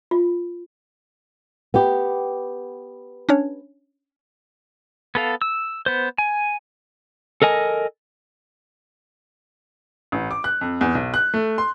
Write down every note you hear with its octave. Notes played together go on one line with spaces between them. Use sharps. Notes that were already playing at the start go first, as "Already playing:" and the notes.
F4
B3 G4
C#4 D4 C#5
B3 A4 F5
E6
B3 C5
G#5
A4 A#4 D#5 G#5
A1
D6
F#6
F2
E2
B1
F#6
A3
C6